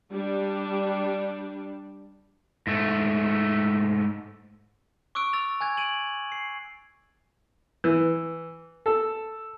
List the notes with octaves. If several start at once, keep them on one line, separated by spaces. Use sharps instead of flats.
G3 D4
G#2 A3
C#6 D6 E6 F#6 D7
E6 A6 F7
G#5 F#6 G#6
D7 D#7 F#7
C7
E3
A4